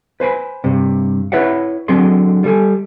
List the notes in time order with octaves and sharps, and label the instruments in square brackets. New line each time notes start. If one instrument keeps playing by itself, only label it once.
[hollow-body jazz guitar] B4 C5 G#5 B5
G2 C3
E4 B4 C#5 E5 F#5
D3 F#3 C4 G#4 C6
G3 A4 G#5